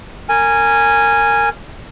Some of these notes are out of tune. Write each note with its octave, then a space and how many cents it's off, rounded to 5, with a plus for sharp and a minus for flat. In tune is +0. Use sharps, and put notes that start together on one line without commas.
A#4 -20 G#5 -5